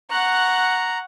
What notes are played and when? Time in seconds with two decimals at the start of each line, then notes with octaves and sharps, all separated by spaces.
0.10 F#5 A#5 C#6 F#6